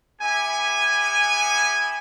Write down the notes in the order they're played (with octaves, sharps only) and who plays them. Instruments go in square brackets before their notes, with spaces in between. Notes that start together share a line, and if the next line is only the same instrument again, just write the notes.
[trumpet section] B3 E4 G4 G#5